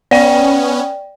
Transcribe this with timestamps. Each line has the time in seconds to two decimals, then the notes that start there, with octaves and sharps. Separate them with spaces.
0.11 B3 C#4 D5 G5